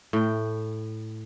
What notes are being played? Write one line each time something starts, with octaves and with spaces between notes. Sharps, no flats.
A2 G5